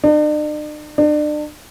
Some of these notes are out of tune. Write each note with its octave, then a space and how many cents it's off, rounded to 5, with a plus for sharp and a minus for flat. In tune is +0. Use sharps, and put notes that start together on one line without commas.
D4 +45
D4 +35